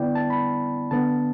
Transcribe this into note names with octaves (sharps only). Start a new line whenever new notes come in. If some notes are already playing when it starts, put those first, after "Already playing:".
Already playing: D3 B3 E4 D5 G5
A5
B5
D3 B3 D4 A5